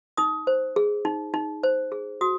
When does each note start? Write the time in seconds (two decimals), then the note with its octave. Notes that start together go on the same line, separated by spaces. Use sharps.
0.18 D#4 D#6
0.47 C5
0.76 G#4
1.05 D#4
1.34 D#4
1.63 C5
1.92 G#4
2.21 F#4 D#6